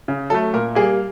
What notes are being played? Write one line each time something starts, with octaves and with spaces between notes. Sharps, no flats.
C#3
F#3 A3 A4
A#2 A#4
G3 A#3 G#4